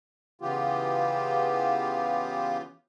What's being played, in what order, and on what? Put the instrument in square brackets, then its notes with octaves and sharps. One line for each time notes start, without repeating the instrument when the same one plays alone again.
[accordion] C#3 E3 B3 F4 G4